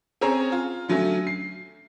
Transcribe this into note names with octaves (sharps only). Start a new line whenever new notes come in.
C4 C#4 G#4 C#5 A#5
F4
D3 F#3 A3 C#4
C7